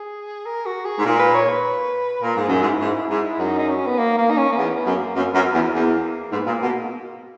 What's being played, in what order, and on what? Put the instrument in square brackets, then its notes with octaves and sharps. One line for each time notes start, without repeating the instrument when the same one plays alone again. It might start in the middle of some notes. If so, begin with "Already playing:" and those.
Already playing: [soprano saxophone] G#4
A#4
F#4
G#4
[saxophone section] G#2
[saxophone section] A#2 [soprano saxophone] A#4
[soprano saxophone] B4
C#5
B4
[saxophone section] A#2 [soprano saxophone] A#4
[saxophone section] G#2
[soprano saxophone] G#4
[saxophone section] F#2
[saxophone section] G#2 [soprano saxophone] E4
[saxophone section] G#2
G#2
[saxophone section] F#2 [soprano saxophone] D#4
[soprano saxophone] D#4
C#4
B3
A#3
A#3
D#4
C#4
A#3
[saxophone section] E2 [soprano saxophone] B3
[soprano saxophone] B3
[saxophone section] F#2
[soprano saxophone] A#3
[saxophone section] F#2 [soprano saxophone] B3
[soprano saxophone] C#4
[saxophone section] F#2 [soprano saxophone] B3
[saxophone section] E2
[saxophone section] E2 [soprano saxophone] A#3
[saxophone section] G#2 [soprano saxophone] B3
[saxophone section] A#2
[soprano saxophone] A#3
[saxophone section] B2